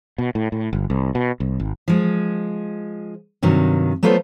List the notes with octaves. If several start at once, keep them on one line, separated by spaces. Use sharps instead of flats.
B2
A2
A2
G1
C2
B2
C2
G#1
F3 G#3
G2 C3 D#3 F#3
F#3 A3 B3 F4 A4 C5